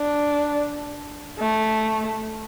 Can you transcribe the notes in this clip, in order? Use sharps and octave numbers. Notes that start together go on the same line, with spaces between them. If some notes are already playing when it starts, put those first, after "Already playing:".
Already playing: D4
A3